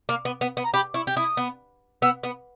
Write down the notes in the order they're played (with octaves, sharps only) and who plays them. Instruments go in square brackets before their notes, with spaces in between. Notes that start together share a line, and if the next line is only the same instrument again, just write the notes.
[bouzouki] A#3
B3
B3
B3
[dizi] A#5
[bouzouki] G4 [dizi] B5
[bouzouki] E4 [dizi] C#6
[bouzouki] G4
[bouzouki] E4 [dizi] D#6
[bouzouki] B3
[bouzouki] B3 [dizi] E6
[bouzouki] B3